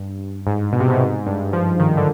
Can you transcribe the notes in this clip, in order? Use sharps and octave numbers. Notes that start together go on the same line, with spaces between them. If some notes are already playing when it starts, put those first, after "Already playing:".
Already playing: G2
G#2
B2
C3
B2
G#2
G2
F3
D#3
D3